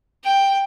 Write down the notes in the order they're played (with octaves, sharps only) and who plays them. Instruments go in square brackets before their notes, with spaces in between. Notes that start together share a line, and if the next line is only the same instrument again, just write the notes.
[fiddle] G5